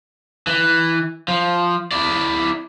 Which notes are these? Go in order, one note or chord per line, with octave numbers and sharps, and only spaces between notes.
E3
F3
E4 D5